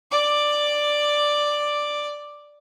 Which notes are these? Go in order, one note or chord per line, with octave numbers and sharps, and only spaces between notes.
D5 D6